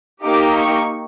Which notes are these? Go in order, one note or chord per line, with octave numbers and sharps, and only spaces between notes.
A#3 D#4 G4 D6
C#6